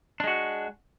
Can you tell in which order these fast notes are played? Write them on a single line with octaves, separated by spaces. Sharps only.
D4 G#3 F#4